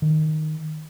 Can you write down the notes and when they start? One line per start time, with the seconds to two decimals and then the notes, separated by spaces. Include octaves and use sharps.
0.02 D#3